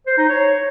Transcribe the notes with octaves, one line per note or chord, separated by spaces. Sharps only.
C5
D#4
C#5